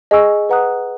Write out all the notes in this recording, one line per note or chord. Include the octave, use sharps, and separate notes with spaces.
G#4 D#5 G#5 C#6 E6
B4 F#5 A#5 D#6 F#6